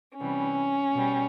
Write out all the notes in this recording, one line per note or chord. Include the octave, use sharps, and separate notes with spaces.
C3 E3 G3 C#4
B2 G3